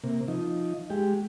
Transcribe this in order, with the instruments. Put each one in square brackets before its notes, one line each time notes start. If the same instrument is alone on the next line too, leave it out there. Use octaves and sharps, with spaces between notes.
[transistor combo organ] C3 A#3
F3 D#4
G#3 G4